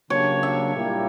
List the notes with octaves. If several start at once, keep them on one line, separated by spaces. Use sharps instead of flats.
C#3 F#3 A#3 D4 G4 C#5
E5
A#2 G3 A#3 E4 G4